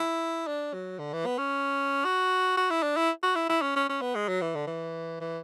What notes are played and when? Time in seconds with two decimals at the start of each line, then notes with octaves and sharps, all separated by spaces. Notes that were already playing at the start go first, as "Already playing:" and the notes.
Already playing: E4
0.48 D4
0.74 F#3
0.99 D3
1.13 E3
1.26 B3
1.38 C#4
2.05 F#4
2.57 F#4
2.70 E4
2.83 D4
2.97 E4
3.23 F#4
3.36 E4
3.50 E4
3.62 C#4
3.76 C#4
3.89 C#4
4.01 B3
4.15 G#3
4.28 F#3
4.42 E3
4.55 D3
4.67 E3
5.21 E3